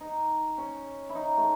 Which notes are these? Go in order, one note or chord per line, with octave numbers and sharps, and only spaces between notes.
D#4
C#4
E4
D#4
A3